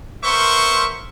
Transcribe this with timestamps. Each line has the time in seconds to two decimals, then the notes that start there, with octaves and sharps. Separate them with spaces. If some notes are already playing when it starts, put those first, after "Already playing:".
0.23 B3 A#4 C5 E5 C6 C#6